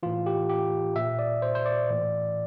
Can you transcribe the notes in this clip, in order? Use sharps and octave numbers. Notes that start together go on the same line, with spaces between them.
A2 E3 F4
G4
G4
A#2 E5
D5
C5
C5
D5
A2 E3